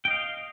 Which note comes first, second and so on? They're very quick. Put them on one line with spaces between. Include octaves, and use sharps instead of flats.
G5 D#5 F5